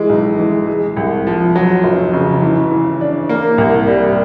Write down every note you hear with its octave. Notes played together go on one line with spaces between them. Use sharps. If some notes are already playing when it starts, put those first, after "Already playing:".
Already playing: E3 G#3
B1
E3
G#3
C2
F3
F#3
F1
C#3
E3
E3
D4
A#3
C2
G3